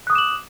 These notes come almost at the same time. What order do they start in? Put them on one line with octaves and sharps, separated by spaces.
F#6 D#6 D6 E7 F#7